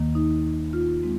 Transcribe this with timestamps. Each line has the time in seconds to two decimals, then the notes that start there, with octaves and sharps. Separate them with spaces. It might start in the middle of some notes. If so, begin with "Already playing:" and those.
Already playing: D#2 D#3 A#3
0.15 D#4
0.73 F4
1.03 G#3 C4